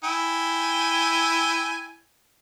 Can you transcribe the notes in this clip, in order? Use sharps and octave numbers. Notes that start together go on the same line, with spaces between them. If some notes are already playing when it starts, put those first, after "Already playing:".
E4 G5 G#5